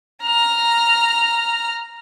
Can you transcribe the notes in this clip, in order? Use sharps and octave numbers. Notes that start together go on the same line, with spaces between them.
A#5 F6